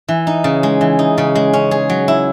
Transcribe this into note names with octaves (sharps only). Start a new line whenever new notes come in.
E3
D#4
C#3
G#3
E3
D#4
C#3
G#3
C#4
G#4
F#3
E4